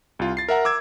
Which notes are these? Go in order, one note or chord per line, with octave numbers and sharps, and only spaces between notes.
C2 F4
A6 C7
A#4 E5 F#5 A#5
D6 E6 G#6